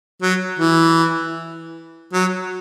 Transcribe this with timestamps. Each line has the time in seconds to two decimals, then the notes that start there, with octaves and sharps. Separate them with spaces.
0.22 F#3
0.59 E3
2.14 F#3